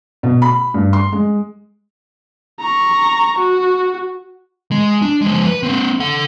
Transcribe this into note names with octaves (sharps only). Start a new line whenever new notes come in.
B2
B5
G2
C6
G#3
A#5 C#6
F#4
G#3
D4
F3 G#3
B4
A#3 C4
A4 F#5